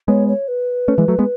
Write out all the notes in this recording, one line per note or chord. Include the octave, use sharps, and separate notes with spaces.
G#3 B3 C#5
C#5
B4
A3 C#4
E3 G#3
F#3 A3
G#3 B3